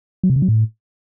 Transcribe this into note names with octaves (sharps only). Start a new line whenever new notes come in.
F#3
C3
C#3
F#3
A2